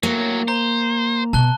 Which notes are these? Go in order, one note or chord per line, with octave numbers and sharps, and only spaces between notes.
A2 F#3 A#3
C5 A#5
B2 A5 F#6 G7